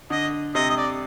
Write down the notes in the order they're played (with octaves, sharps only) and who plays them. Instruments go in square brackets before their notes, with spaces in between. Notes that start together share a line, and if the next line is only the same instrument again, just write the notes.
[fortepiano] D3 [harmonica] D#5
[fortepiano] C3 [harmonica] D#5
[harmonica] D#5
D5